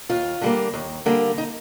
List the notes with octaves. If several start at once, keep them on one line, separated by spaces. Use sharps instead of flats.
D#2 F4
D3 G3 A#3
D#2
D3 G3 A#3
D#4